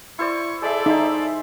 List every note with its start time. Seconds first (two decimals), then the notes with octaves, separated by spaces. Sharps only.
0.19 E4 C5 D5 C#6
0.62 G#3 A4 D5 E5
0.86 D#4 C5 E5